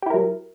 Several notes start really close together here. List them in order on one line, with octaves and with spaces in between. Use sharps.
G4 E4 A#4 F#3